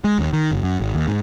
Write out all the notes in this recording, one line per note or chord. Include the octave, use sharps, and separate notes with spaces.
G#3
D#2
D#3
F#1
F#2
G#1
D#2
G#2